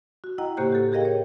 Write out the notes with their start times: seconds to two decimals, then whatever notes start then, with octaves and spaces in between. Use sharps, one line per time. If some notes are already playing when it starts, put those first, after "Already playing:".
0.24 F#4
0.38 E4 D#5 F#5 G5 A#5
0.57 A2 C#3 A#3 G4 C5 F#6
0.72 G4 A4
0.92 G4 G#4 A#4 D#5 F5 G5
1.05 C#5